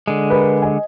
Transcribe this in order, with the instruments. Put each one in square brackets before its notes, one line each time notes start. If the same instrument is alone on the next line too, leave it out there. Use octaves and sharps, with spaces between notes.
[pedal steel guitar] D3 G#3
[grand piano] A#4 B4
D#5 G#5